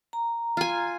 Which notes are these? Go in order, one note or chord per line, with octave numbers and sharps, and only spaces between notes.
A#5
F4 G#5